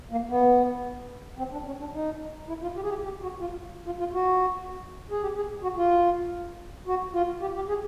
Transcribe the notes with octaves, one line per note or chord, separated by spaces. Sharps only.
A#3
B3
C4
D4
C#4
D4
D#4
E4
F4
G4
G#4
G4
G4
F#4
F4
F4
F4
F#4
G#4
G4
G#4
F#4
F4
F#4
F4
G4
G4
G#4